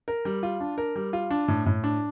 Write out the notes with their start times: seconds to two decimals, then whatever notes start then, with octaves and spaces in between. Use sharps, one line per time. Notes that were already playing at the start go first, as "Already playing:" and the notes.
0.08 A#4
0.25 G3
0.43 F4
0.60 D4
0.78 A#4
0.96 G3
1.13 F4
1.31 D4
1.48 A2
1.66 A2
1.84 D4